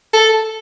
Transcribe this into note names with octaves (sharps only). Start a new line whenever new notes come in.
A4